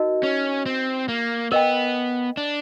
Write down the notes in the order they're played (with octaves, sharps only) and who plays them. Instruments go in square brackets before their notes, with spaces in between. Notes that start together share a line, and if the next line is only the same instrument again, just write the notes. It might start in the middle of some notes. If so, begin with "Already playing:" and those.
Already playing: [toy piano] D#4 F#4 A#4 D#5
[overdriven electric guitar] C#4
C4
A#3
[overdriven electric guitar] B3 [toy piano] A#4 D#5 G5
[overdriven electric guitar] D4